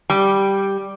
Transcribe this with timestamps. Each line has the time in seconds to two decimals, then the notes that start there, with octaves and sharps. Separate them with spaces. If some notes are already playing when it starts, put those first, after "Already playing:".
0.10 G3